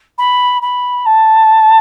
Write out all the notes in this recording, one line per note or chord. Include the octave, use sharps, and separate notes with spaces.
B5
B5
A5